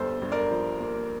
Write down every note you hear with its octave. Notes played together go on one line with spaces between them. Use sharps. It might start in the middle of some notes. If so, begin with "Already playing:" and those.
Already playing: G1 G3 A4 C5
G2
A#4 D5
F3
A#3